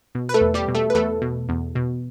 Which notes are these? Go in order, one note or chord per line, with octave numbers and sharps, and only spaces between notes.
B2
B4
A3 A4
E2
G3 G4
B2
A3 A4
B4
E2 A3 A4
B2
E2
B2